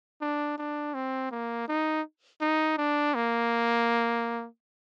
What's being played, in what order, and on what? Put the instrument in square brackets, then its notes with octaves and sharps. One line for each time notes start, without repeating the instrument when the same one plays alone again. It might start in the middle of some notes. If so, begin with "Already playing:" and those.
[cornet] D4
D4
C4
A#3
D#4
D#4
D4
A#3